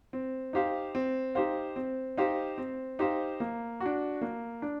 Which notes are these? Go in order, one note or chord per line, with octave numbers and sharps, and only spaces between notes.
C4
D#4 G4 C5 F5
C4
D#4 G4 C5 F5
C4
D#4 G4 C5 F5
C4
D#4 G4 C5 F5
A#3
F#4
D4
A#3
D4